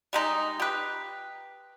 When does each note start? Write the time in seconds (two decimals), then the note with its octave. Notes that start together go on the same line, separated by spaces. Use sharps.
0.13 G3 G#3 D#4
0.60 G4 B4